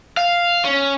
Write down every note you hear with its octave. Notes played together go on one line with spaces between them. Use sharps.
F5
C#4